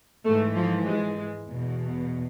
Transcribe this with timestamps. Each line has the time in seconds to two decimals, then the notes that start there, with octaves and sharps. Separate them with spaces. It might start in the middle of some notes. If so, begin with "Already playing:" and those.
0.25 G#2 E3 A3
0.55 F3
0.85 G#3
1.46 E2 B2